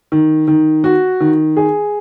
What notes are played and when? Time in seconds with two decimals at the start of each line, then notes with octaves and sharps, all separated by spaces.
0.12 D#3
0.48 D#3
0.84 F#4
1.20 D#3
1.57 G#4